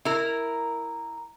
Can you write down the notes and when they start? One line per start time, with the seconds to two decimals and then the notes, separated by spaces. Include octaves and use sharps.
0.05 E4 A#4